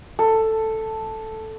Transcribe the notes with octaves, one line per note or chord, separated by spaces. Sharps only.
A4